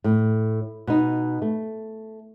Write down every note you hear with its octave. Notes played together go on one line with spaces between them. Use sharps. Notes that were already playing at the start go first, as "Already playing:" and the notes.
A2
B2 D#4
A3